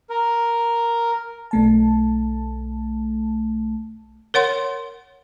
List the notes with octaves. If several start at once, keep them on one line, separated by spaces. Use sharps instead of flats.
A#4
B1 A3 A5
A#4 C#5 F#5 C6